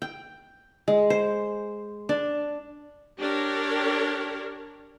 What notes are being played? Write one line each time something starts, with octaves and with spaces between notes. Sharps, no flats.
G5
G#3
C5
D4
D4 G4 A#4 C#5